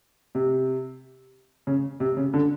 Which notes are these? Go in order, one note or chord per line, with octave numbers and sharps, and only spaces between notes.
C3
C#3
C3
C#3
D3